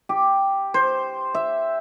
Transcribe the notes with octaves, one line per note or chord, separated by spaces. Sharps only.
G4
C5
E5